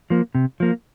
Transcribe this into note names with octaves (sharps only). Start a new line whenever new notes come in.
F3 A#3
C3
F3 A#3